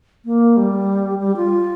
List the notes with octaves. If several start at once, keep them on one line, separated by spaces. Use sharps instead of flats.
A#3
G3
G3
F4